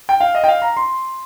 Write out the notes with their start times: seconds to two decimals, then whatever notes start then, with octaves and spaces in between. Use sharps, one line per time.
0.09 G5
0.20 F5
0.35 D#5
0.44 G5
0.48 F5
0.62 A#5
0.77 C6